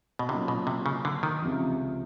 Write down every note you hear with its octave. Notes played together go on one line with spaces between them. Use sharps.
B2
C3 F#3 A#3 C#4 F4
B2
C3
C#3
D3
D#3
C#2 C3 F3